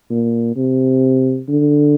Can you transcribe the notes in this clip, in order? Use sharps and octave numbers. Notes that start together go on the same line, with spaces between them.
A#2
C3
D3